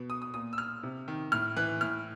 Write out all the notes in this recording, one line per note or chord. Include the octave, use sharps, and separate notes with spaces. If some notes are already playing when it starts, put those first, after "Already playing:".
Already playing: B2
D#6
D#6
A#2 D#6
E6
F6
C3
D#3
A2 F6
E3 F#6
A2 F6